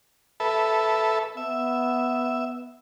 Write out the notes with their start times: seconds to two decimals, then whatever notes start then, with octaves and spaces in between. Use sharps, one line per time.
0.40 A4 B4 E5
1.37 B3 E5